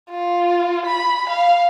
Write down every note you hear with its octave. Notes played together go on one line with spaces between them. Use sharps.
F4
B5
F5